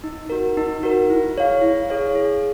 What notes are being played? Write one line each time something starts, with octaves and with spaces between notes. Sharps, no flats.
D#4
F#4 A#4
D#4
F#4 A#4
E4
G#4 C#5 F5
E4
G#4 C#5 F5
G#4